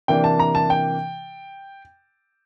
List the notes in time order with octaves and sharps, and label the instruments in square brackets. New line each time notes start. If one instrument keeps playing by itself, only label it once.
[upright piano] C3 E3 A#3 D4 G5
A5
A#5
A5
G5